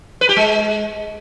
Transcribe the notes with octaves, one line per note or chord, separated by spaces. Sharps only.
B4
G4
G#3